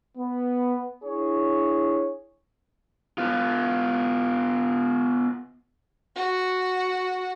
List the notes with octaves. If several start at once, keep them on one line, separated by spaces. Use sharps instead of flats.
B3
D4 E4 G#4 C#5
B3 F4
F#4 F#5